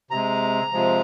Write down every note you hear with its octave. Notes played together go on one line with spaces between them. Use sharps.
C3 G#3 A#5
C3 F3 G#3